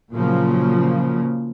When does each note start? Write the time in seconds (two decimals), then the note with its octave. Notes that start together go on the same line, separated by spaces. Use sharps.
0.13 A#2 C#3 F3 F#3 A#3